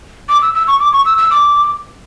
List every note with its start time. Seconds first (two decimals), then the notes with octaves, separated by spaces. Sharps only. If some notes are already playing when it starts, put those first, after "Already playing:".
0.29 D6
0.42 E6
0.54 E6
0.67 C#6
0.80 D6
0.93 C#6
1.05 E6
1.18 E6
1.31 D6